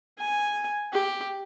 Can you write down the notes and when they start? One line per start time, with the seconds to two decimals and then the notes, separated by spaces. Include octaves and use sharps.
0.19 G#5
0.93 G4